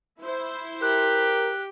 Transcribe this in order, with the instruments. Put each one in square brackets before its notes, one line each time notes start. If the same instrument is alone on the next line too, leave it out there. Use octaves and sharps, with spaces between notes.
[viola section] E4 C5
[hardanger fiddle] G4 [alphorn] A#4 [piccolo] F#6